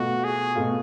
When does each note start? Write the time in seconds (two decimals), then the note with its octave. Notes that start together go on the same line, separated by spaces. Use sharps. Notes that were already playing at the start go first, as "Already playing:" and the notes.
Already playing: B2 A3 F4 F#4
0.24 G#4
0.55 B2 A3 F4